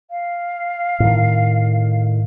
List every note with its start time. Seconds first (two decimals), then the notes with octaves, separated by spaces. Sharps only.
0.11 F5
1.00 A2 D#3